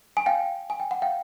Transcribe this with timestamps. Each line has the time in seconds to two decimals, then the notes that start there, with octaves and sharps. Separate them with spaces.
0.17 G#5
0.26 F5 G5
0.70 G#5
0.80 G5
0.91 F#5
1.02 F5 G5